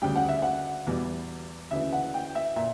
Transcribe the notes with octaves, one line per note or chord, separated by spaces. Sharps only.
D2 C#3 G3 G5
F#5
E5
F#5
E2 B2 G3
D2 C#3 E3 E5
F#5
G5
E5
A#2 E5